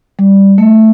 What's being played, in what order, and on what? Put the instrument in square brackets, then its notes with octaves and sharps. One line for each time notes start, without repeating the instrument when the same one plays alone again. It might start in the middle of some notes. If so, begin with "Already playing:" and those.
[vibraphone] G3
A3